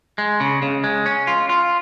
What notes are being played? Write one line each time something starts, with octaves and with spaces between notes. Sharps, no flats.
G#3
C#3
C#3
G#3
C#4
F4
F4